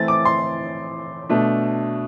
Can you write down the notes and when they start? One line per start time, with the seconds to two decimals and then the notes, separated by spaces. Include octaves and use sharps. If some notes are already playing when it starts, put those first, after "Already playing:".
Already playing: E3 A3 C4 A6
0.08 D6
0.25 C6
1.30 B2 A3 D4